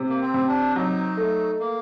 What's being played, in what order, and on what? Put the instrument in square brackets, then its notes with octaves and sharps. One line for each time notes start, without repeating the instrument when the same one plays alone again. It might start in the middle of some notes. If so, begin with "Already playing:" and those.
Already playing: [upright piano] C3
[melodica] A#3
C4
[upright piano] C3
[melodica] D4
[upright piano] F#3 [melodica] D#4
[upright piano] A3
[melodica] A#3